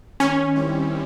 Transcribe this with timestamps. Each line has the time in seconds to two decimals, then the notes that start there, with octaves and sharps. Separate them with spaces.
0.20 D#3 C#4
0.56 G3 C4 E4 G4